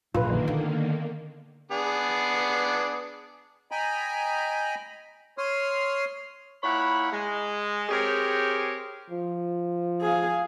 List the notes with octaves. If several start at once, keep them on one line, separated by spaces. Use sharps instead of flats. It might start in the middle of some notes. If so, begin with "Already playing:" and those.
A#1 F#2 D3 D#3 A#3 F4 B4
B3
B3 D4 G#4
D#5 G5 G#5 A#5 B5
C#5 C6 D#6 F6
A#2 E4 C#5 F#5 B5
G#3
C4 G4 G#4 A#4 C#5
F3
G#4 F5